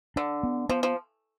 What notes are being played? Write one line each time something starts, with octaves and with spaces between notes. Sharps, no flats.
D3 D4
B3
F3 B3
F3